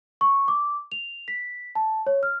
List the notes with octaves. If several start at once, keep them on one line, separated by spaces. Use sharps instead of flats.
C#6
D6
F7
B6
A5
C#5
F6